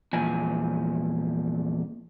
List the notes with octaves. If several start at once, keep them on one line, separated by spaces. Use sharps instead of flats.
E2 A#2 F3 G#5